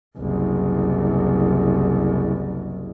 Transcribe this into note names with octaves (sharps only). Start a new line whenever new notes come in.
F#1 C2